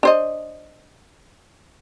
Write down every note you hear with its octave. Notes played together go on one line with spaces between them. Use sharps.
D4 C5 D#5